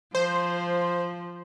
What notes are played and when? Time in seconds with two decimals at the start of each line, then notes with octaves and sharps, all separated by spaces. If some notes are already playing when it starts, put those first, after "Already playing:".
0.15 F3 C5